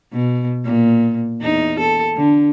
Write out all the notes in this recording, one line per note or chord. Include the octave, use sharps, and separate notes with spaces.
B2
A#2
E2 D#4
A4
D3